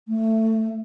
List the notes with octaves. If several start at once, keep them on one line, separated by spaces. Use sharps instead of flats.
A3